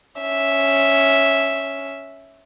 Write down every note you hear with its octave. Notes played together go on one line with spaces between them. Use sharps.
C#4 E5